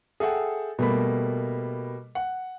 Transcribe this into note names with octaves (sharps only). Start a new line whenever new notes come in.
G#4 A4 E5 F#5 G5
B2 G3 A3 A#3 B5
F#5